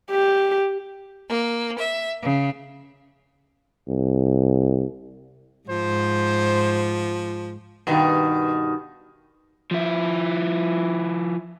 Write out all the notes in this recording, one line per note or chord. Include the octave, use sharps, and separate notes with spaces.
G4
A#3
E5
C#3
C2
G#2 F3 C5
G2 B2 D#3
F3 E4